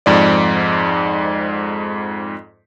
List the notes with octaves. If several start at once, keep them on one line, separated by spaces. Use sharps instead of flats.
F2 G#2 D5